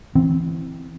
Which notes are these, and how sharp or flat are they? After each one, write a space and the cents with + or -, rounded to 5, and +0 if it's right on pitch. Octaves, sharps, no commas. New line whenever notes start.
E3 +0 C4 +0